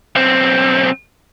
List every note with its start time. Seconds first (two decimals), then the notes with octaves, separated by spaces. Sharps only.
0.15 B1 C4